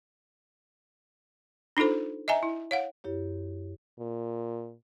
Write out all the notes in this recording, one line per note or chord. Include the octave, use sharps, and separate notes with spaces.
D4 D#4 F4 A4 C5
D#5 E5 G#5 A#5
E4
C#5 F5 F#5
F#2 E4 G4 C#5
A#2